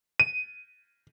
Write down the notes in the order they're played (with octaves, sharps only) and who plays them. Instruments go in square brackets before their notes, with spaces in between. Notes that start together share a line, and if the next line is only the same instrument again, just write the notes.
[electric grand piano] D#7